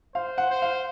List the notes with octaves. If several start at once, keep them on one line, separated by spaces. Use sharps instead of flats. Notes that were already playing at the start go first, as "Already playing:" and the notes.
C5 F5
F#5
C5
F5